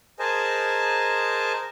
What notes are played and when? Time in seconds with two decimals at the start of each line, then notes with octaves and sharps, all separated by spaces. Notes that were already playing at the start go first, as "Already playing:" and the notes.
0.19 G#4 A#4 C5 D#5 G#5 A5